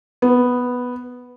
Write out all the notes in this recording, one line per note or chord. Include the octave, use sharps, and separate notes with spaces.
B3